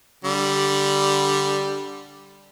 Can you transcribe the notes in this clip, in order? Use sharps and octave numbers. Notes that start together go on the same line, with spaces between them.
D3 G3